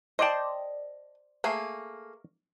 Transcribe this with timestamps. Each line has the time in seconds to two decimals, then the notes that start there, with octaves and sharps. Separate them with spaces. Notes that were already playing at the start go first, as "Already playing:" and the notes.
0.19 C5 D5 D#5 G5 A5
1.44 A3 A#3 G#4